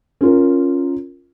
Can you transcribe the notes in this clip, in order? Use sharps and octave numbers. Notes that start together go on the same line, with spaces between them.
C#4 F4 A#4